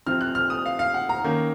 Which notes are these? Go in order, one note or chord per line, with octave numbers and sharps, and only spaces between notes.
C3 F3 C4 F6
F#6
F6
D#6
F5
F5
F#5
A#5
D#3 A#3 C#4